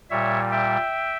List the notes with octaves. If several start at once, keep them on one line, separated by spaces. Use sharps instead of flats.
A#2 G3 C#5 E5
E5 G5